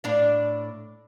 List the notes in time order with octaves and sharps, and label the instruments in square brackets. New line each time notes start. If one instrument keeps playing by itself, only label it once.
[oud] A2 D4 F5